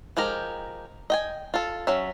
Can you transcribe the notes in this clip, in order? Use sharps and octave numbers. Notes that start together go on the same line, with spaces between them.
F3 G#3 G4 A#4 A#5
D#5 G5 G#5
F4 A4
F#3 C#4 E5